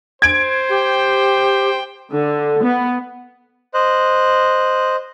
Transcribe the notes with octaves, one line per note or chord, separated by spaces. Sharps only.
C5 G#6 D7
G4 G5
D3
B3
C5 D#5 F#6